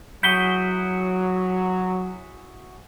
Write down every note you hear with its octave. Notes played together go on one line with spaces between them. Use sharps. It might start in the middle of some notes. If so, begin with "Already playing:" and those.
F#3 E4 F#4 G#4 G6 B6 G7